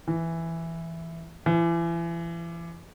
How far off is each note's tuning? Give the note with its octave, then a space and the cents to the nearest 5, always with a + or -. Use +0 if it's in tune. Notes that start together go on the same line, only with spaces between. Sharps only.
E3 +5
E3 +35